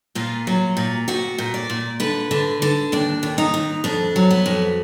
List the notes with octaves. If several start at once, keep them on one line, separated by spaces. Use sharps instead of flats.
A#2 F4
F#3
A#2
A#2 F#4
A#2
D5
A#2
D3 B4
D3
D3
D#2 D4
D#2
D#4
D#2
F2 D4
F#3
B3
F2